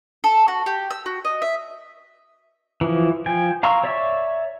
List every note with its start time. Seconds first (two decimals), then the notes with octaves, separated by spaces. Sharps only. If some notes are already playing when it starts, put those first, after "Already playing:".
0.24 A4
0.48 F#4
0.66 G4
0.91 E6
1.06 F#4
1.25 D#5
1.42 E5
2.81 E3 F3
3.26 F3 G5 G#5
3.63 F5 A#5 C6 C#6 E6
3.84 C#5 D5 E5 C#6 E6